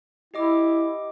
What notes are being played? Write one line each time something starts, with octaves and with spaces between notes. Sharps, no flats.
E4 G4 D#5 D6